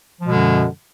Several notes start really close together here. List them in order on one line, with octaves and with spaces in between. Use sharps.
F3 G#3 B2 D3 F#2